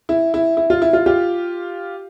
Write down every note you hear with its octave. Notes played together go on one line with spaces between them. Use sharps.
E4
E4
E4
F4
E4
F4
F4 G4